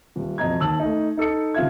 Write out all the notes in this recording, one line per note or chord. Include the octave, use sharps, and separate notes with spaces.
D#1
E1 F2 D#5 A#5 G#6
D#2 A5 E6 F#7
A3 D#4
D#4 A4 D#6 C#7
D#1 C#3 F4 E5 G#6